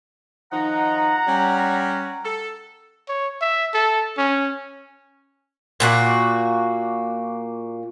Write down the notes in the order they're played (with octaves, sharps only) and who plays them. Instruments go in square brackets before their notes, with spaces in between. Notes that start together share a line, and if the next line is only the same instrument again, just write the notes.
[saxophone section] D#3 F3 D#4 [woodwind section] F#5 A#5
[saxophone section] G3 C#4
A4
[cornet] C#5
E5
A4
C#4
[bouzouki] A#2 A#3 F#4